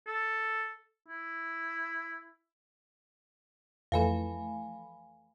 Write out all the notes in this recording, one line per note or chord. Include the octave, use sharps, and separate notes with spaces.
A4
E4
F2 E3 A3 F5 G#5 B5